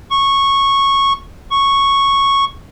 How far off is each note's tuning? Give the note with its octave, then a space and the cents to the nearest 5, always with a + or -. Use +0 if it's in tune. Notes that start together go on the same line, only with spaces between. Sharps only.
C#6 -10
C#6 -5